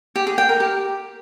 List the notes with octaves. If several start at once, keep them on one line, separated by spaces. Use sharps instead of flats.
G4
G#4
G5
A#4
G4